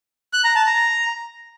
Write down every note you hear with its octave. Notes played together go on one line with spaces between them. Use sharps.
F#6
A#5
A5
A#5